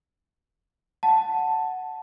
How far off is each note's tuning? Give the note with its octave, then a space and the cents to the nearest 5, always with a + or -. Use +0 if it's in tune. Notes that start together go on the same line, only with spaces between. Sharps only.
F#5 +0 A5 +5